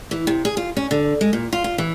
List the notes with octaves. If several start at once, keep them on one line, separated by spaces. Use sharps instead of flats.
E3
C3
G#4
F4
C#4
D3
G#3
A#2
F4
F4
E3